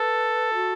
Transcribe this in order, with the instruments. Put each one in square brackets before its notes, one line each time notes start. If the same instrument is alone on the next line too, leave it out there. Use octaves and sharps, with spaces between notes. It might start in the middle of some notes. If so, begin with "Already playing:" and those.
Already playing: [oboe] A4 [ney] B4
[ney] F#4